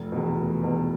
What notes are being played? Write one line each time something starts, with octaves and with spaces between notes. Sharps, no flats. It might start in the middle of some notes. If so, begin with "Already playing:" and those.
Already playing: F1
E2 B2
F1
E2 B2